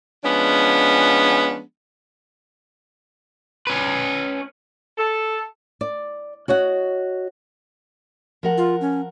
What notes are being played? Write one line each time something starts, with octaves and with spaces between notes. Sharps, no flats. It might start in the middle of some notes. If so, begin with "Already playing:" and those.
F3 G#3 B3 C#4 D4
C#4 B4
A4
D5
F#4 C#5 D#5 F#5
F3 A#4 F#5
F4
C#4